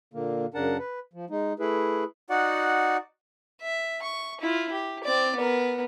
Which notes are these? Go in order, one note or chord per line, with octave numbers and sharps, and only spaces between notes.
A#2 D3 A#3
F#2 C#3 D4 A#4 F#5 A5
B4
F3
G#3 D#4
A3 E4 G#4 B4
D#4 F#4 D5 F#5
E5
C#6
E4 F4
G4
C4 D5
B3 A#4